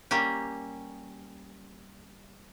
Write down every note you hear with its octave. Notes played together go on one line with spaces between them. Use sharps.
G3 A#3 C#4 G4